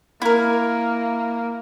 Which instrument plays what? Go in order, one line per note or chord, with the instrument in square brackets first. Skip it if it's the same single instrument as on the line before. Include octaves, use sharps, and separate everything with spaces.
[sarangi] A#3 [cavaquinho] E4 A#4